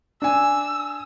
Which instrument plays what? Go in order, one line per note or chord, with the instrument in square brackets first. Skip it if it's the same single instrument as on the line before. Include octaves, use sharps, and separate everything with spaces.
[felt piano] D4 G#5 [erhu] E6